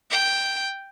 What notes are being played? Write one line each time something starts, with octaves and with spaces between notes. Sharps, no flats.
G5